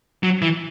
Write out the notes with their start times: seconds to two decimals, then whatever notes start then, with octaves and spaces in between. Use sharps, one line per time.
0.23 F#3
0.42 E3